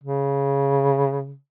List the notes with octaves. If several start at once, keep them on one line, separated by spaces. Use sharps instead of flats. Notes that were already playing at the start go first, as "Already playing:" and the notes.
C#3